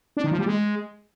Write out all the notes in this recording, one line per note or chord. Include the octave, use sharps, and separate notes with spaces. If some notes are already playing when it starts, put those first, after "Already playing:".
D4
D#3
F3
G3
G#3